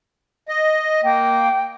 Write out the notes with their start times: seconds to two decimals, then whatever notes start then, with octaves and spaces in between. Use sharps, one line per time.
0.49 D#5
1.04 A#3 G5